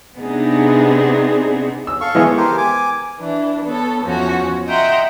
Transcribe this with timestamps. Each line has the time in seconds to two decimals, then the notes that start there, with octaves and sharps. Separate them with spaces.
0.18 C3 B3 C4 D4 D#4 G#4
1.87 E6
2.01 A4 F5 C#6
2.15 E3 G#3 B3
2.37 G4 A#4 C5
2.58 G#5 D6
3.18 E3 D4
3.65 B3 A4 C#5
4.04 E2 F3 C#4 F#4
4.67 D#5 E5 F#5 G5 A#5 C6